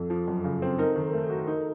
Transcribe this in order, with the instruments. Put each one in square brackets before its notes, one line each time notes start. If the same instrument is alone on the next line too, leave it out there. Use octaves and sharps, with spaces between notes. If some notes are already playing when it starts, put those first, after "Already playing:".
Already playing: [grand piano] F2 [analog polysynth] A4
[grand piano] F3
F#2
C#3
C4
[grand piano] D#4 [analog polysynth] A#4
[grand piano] D#3
A3
F#4
D#4